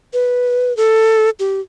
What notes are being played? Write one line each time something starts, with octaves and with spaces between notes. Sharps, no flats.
B4
A4
G4